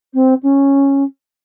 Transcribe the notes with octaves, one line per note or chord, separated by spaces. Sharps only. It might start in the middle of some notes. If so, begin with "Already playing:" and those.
C4
C#4